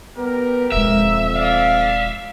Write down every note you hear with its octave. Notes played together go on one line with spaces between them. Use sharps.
G3 B3 G4 A#4
D#1 F2 G#3 E5
D5 F5